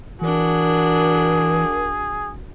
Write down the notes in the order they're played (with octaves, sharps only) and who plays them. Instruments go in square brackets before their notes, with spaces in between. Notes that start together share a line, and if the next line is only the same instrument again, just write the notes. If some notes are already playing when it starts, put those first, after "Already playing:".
[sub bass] E3 [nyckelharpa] D4 F#4 [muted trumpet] G#4 [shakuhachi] A#4